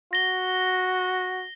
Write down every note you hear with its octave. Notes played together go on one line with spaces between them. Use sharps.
F#4 A#6 G7